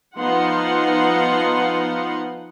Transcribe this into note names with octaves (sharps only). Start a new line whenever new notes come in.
F3 B3 D#4 F5 F#5 C6